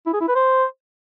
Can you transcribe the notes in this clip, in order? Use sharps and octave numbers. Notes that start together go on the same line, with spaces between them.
E4
G#4
E4
B4
C5